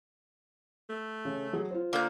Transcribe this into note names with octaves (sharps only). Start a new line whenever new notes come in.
A3
C#3
F#3 G#4
F4 C5
D3 A#3 G6